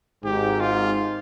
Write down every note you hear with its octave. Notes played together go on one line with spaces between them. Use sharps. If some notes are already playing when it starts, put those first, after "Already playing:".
G#1 G#2 G4
F4